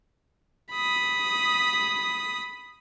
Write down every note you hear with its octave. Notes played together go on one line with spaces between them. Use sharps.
B5 D#6